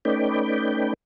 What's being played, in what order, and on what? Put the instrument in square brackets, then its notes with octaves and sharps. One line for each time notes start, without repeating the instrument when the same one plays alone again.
[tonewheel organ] A3 C#4 D#4 B4 D5 G5